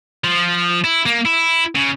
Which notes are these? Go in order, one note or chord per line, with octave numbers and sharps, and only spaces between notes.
F3
E4
A#3
E4
C#3